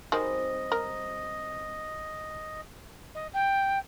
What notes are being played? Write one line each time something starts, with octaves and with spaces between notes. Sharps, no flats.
D#3 G3 G#3 C4 F#4 D#5
A#4
D#5
G5